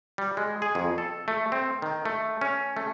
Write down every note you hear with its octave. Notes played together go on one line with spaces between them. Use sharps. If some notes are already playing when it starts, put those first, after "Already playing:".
G3
G#3
G#4
F2
A4
A3
C4
D#3
A3
C#4
A3